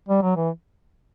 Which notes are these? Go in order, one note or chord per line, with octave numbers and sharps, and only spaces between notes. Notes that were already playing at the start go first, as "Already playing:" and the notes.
G3
F#3
E3